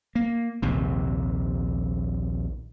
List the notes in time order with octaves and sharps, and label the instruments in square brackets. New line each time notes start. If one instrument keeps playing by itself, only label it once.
[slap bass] A#3
A#1 D#2 C3